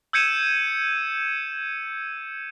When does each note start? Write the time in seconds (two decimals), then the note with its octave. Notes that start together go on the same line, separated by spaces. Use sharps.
0.13 E6 G6 G#6 C#7 D#7 E7